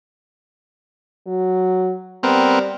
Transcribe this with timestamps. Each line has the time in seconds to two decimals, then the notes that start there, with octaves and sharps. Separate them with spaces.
1.27 F#3
2.23 G3 B3 C4 A#4